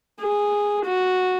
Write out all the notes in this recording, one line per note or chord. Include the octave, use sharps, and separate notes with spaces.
G#4
F#4